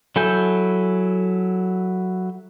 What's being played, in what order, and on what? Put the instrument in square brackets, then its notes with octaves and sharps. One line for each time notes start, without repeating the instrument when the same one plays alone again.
[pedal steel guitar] F#3 E4 A4 G#5 G6